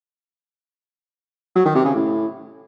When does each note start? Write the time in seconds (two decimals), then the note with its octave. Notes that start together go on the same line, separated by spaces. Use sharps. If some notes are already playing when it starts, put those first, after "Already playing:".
1.56 F#3
1.65 D#3
1.75 C3
1.85 C#3
1.94 A2